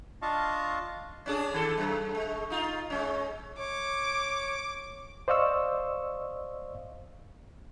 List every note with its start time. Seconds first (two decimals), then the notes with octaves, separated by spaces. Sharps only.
0.22 D4 F4 D#5 F5 A5 C#6
1.26 C#4 D4 G#4
1.54 D#3 A4
1.77 F#2
2.15 G#3
2.50 D#4 F4
2.90 G#3 C#4
3.59 C#5 D6
5.28 C5 D5 D#5 F5 C#6 E6